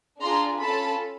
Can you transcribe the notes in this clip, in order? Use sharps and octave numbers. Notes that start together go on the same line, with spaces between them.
D4 F4 G#4 A#5 C6
C#4 F4 A4 A5 B5